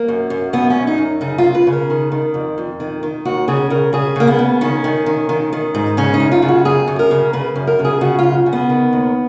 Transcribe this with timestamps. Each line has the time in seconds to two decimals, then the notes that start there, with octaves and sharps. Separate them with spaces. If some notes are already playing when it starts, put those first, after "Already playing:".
Already playing: A#3
0.08 F#2
0.30 F#2
0.53 F#2 B3
0.70 C#4
0.76 F#2
0.87 D#4
0.98 F#2
1.21 C#3 D#4
1.38 F4
1.44 C#3
1.55 B4
1.67 C#3
1.72 A#4
1.90 D#3
2.12 D#3
2.34 F2
2.58 F2
2.80 D#3
3.03 D#3
3.25 D#2 F#4
3.48 C#3 G#4
3.70 C#3 A#4
3.93 C#3 G#4
4.16 C#3 A#3
4.27 B3
4.39 C#3
4.61 D#3 C#4
4.84 D#3
5.06 D#3
5.29 D#3
5.53 D#3
5.75 G#2
5.97 C#3 C#4
6.14 D#4
6.20 F#2
6.32 F4
6.42 C#3
6.49 F#4
6.65 F#2 G#4
6.88 F#2
6.99 A#4
7.11 C#3
7.33 C#3 B4
7.56 F#2
7.67 A#4
7.79 C#3
7.85 G#4
8.01 C#3 F#4
8.19 F#2 F4
8.46 C#3
8.53 B3
8.70 D#3
8.93 D#2